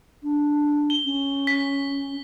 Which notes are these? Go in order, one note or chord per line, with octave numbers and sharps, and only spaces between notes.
D4
G7
C#4
B6